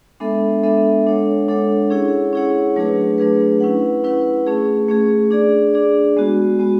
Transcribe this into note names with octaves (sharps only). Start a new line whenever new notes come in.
G#3 B3 D4 A4 E5
G#3 B3 D4 A4 E5
G#3 D4 A4 C#5 F#5
G#3 D4 A4 C#5 F#5
C#4 E4 G#4 C#5 F#5
C#4 E4 G#4 C#5 F#5
F#3 A3 D4 G#4 B4
F#3 A3 D4 G#4 B4
C#4 E4 B4 F#5
C#4 E4 B4 F#5
A3 C#4 G#4
A3 C#4 G#4
D4 G#4 D5
D4 G#4 D5
G#3 B3 F#4
G#3 B3 F#4